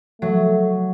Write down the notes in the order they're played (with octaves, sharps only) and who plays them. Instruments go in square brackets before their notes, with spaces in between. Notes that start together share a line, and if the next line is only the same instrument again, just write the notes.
[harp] F#3 [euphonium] A3